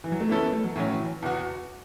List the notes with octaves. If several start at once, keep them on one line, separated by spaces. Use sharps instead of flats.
E3
F#3
A3
E3 B3 C#4 E4 A4
B3
A3
F#3
A2 E3 F#3 C#4
E3
E3
E2 B2 B3 F#4